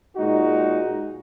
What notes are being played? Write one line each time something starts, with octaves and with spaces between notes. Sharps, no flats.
A#2 G#3 D#4 F#4